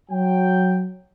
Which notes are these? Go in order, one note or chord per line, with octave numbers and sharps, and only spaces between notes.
F#3 G5